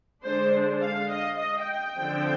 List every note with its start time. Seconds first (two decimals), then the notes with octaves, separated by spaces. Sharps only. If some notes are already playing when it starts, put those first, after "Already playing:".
0.24 D3 G#3 D4 C5
0.82 F5
1.10 D#5
1.39 D#5
1.67 G5
1.96 D3 F3 C4